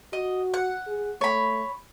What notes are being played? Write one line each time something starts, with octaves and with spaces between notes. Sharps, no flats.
F#4 D#5
F#5
G#4
A3 C#5 B5